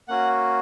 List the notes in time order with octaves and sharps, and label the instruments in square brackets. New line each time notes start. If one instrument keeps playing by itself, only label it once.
[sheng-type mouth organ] A#3 C#4 F#4 F#5